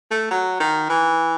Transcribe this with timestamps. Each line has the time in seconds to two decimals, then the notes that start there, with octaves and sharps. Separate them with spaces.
0.11 A3
0.31 F#3
0.60 D#3
0.90 E3